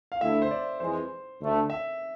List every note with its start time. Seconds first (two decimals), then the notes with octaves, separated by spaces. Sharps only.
0.12 F5
0.21 D2 D3 A3 E4 E5
0.42 C5
0.51 D5
0.80 F2 E3 G#3 C5
1.39 D2 D3 A3
1.70 E5